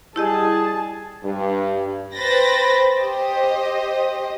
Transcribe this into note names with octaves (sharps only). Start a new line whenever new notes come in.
G3 E4 G4 G#4 D#5 A5
G2
B4 C5 G5 B5 A6 A#6
G4 C5 D#5